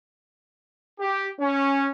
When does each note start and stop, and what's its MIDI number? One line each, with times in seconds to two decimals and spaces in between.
0.99 1.27 67
1.40 1.90 61